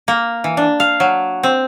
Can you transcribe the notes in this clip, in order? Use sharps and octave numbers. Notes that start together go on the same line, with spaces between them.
A#3
E3
D4
F5
F#3
C4